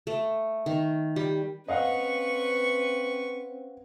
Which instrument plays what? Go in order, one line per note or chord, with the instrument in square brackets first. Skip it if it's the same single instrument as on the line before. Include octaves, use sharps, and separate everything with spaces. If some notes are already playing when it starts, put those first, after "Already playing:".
[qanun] A3
D#3
G3
[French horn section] C4 C#4 [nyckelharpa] B4 C#6 [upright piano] D#5 F5 F#5